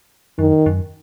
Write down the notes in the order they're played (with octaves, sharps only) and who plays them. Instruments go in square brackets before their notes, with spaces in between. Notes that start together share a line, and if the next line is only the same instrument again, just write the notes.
[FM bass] F#2 [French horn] D#3
[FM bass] F#2